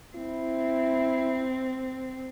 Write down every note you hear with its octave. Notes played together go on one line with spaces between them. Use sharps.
C4 E4